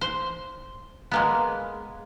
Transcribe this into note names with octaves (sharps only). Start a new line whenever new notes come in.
C5
G#3 A#3 B3